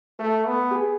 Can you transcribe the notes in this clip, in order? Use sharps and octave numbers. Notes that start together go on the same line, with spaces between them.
A3 A4
B3
G4
G#4